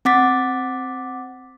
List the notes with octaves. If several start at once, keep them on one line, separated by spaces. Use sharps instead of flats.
C4 F#5 D6 A6 B6